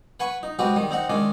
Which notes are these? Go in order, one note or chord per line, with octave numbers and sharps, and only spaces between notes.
B4 F#5 G#5 B5 C#6
D#4
G#3 C4 F#4 G4 B4
D#3 G3 D#6
C4 D#4 F#5
D#3 G#3 C#4 D4